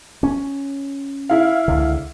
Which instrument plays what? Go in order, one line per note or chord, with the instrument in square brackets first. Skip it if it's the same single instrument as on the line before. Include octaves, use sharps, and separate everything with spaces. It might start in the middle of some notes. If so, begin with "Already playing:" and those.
[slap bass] C#4
[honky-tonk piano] E4 F5
[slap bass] C#2 D3